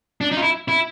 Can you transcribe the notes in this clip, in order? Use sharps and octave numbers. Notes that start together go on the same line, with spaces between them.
D4
D#4
F4
E4
E4